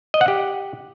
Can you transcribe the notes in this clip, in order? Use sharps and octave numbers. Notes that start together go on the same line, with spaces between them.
D#5
F#5
G4